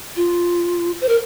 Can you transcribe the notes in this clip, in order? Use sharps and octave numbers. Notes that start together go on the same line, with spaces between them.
F4
C5
A#4